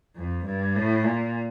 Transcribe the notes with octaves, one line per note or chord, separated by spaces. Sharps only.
F2
G2
A2
A#2